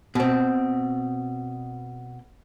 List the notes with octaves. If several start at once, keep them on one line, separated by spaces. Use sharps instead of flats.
B2 C4